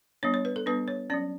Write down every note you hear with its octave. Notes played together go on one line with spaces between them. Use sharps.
G3 B3 D4 C#5
C#5
B4
A4
G3 B3 D4 B4
C#5
F#3 C#4 D5